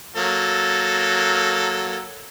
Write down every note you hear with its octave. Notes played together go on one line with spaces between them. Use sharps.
F#3 A#3 A4